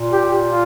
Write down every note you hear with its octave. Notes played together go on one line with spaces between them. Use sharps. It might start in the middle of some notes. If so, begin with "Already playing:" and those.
Already playing: A#2
G4
F4